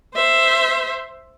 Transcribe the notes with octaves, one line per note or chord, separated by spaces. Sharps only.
C5 E5